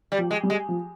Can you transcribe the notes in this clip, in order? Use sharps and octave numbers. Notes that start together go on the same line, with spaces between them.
G3
F3
G#3
G3
G#3
F3